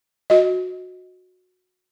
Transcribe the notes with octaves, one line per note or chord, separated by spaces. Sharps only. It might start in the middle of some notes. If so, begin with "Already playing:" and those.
F#4 D#5